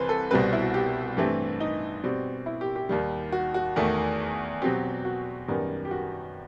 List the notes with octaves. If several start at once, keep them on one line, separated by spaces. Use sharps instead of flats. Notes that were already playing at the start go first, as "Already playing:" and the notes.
Already playing: C2 C3 E3 B4 C5
A4
C2 B2 G3 C4 B4
E4
F#4
G4
G2 E3 A3 C4 G4
D#4
B2 G3 C4
E4
G4
G4
D#2 D#3 G3
F#4
F#4
E2 D#3 A3
B2 F#3 C4 G4
F#4
F#2 D#3 G3 B3
G4
F#4